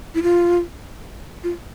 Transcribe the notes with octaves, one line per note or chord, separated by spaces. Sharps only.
E4
F4
F4